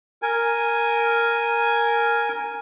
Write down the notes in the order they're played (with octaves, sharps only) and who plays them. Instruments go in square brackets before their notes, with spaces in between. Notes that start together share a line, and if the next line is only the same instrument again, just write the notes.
[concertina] A#4 G#5